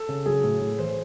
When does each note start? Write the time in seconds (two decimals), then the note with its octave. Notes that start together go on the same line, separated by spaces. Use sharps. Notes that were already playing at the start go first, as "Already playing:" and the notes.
Already playing: A4
0.09 C#3
0.26 F#3 G#4
0.44 A2
0.61 A2
0.79 E3 C5